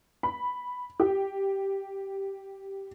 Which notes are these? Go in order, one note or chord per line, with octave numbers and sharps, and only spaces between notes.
B5
G4